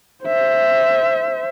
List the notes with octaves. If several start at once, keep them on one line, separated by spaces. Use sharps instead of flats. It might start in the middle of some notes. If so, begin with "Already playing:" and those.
C5 E5